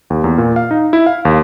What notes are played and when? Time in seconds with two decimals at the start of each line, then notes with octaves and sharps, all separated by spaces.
0.10 D#2
0.24 E2
0.38 A#2
0.56 F5
0.71 D#4
0.93 E4
1.06 F5
1.25 D#2